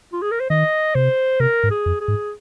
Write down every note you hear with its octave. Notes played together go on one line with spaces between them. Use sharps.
F4
G#4
A#4
C5
D#3 D#5
C3 C5
C3 A#4
G#2
G#4
F2
G#4
G#2